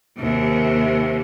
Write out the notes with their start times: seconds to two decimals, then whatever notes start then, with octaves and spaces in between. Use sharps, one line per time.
0.18 D#2 C3